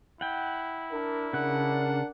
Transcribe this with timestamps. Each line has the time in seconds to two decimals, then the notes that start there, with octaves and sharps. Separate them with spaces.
0.21 E4 F#5 G5
0.91 D4 A#4
1.33 C#3 D4 A#4 F#5 F#6